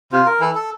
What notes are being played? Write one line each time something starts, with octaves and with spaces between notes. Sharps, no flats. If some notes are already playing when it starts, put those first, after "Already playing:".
C3 F4
A#4
E3 A4
A4